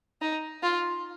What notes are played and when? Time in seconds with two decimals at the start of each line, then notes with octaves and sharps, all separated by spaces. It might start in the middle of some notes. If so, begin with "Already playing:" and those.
0.21 D#4
0.63 F4